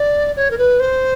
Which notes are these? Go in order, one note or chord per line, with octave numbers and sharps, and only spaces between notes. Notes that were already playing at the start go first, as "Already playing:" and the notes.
Already playing: D5
C#5
A#4
B4
C5